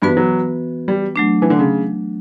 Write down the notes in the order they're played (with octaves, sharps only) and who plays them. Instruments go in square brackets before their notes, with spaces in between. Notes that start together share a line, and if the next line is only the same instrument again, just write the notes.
[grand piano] G2 [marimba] E3 B3 F#4 B4
[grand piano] F#3
G3
[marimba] F#3 A3 D4
[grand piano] E3
D3
C#3